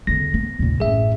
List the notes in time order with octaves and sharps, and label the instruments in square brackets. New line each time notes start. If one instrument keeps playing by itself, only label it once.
[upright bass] E2 D3 [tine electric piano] A#6
[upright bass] B3
D#2 A#2
[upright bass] A1 F#2 [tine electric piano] G#4 E5